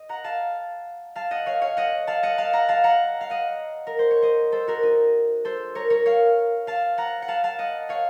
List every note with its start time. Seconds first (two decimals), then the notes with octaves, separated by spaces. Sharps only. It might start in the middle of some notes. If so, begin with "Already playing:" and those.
Already playing: D#5
0.09 F#5 A#5
0.24 F5 A5
1.16 F5 A5
1.31 D#5 F#5
1.46 C#5 F5
1.61 C#5 F5
1.77 D#5 F#5
2.07 F5 A5
2.23 D#5 F#5
2.38 F5 A5
2.53 F#5 A#5
2.68 F5 A5
2.84 F#5 A#5
3.21 F5
3.30 D#5 F#5
3.87 A#4
3.99 C5
4.11 C#5
4.22 C5 D#5
4.52 A4 C5
4.67 F#4 A#4
4.83 D#4
5.45 A4 C5
5.75 A#4 C#5
5.90 A#4 C#5
6.06 C#5 F5
6.67 F5 A5
6.98 F#5 A#5
7.22 F#5
7.28 F5 A5
7.43 F5 A5
7.59 D#5 F#5
7.89 C#5 F5